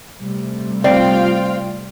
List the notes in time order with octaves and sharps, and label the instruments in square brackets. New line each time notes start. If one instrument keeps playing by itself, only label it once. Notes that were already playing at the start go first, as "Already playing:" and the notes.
[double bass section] C3 G3 A3
[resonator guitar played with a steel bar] C4 [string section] F4 F5 G5 [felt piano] D5